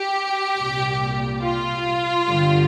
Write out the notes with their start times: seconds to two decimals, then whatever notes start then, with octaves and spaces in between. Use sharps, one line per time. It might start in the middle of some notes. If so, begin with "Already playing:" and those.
Already playing: G4
0.57 C2 A#2 G3
1.42 F4
2.27 G2 D3 G3